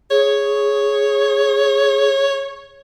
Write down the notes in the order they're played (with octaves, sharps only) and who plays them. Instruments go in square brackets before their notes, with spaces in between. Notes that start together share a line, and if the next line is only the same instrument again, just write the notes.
[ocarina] G#4 [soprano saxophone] C#5